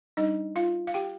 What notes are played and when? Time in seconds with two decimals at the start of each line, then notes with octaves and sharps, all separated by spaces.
0.17 G3 D4 D#4 D#5
0.56 F4 F5
0.87 F5
0.94 G4 G5